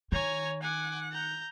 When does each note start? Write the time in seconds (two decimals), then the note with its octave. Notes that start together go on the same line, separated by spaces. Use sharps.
0.12 D#3 C#5 G#5 A#5
0.63 F#5 G#5 D6
1.12 A#5 G6